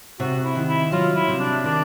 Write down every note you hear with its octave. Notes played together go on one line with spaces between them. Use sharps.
C3 F#4
E4
D#3
E4
F#3 F4
E4
C3
D4
D#3 D4